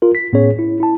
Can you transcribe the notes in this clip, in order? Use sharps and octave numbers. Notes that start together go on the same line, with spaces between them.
F4 A#4
B6
A2 B3 C#4 G#4 C#5
E4
E4 A5